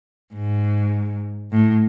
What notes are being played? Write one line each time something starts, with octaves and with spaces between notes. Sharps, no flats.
G#2
A2